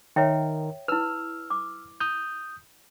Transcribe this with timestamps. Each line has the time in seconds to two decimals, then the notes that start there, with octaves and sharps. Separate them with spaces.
0.16 D#3 A#4 C#5 E5 G5
0.88 E4 B4 E6 F6
1.50 D6
2.00 D#6 G6